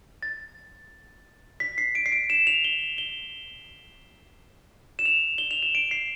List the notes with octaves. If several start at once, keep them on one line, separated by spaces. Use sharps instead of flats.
A6
B6
C7
D7
C7
D7
E7
F7
G7
G7
E7
F7
G7
F7
E7
D7
C7